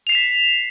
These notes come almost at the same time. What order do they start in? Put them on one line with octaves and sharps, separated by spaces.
F7 C7 E7 B6